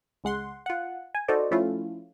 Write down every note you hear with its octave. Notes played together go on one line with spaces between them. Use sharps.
C#2 G#3 F#5 C6
F4 F#5
G#5
D#4 F#4 A4 C5 D5
F3 A3 C#4 E4 F4